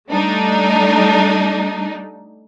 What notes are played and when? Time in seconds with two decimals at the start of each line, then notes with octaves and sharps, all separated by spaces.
0.11 G3 A3 D4 D#4